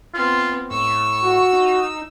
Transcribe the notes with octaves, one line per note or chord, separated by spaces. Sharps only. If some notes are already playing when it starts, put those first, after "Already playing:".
B3 C4 F4
A2 C#6 E6
F#4
D#4